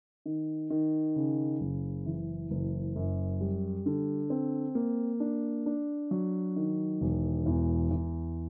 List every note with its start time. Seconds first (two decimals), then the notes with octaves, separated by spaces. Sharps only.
0.26 D#3
0.70 D#3
1.16 C#3
1.61 F#1
2.06 E3
2.50 F#1
2.96 F#2
3.41 G3
3.86 D3
4.30 C4
4.75 A#3
5.20 D4
5.66 D4
6.11 F#3
6.56 D#3
7.01 E1
7.46 E2
7.91 E2